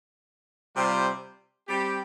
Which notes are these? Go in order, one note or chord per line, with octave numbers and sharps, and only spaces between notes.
C3 G3 C4 F4 C5
G3 C4 G4